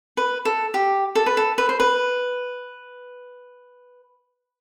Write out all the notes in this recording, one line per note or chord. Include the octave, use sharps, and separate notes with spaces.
B4
A4
G4
A4
B4
A4
B4
C5
B4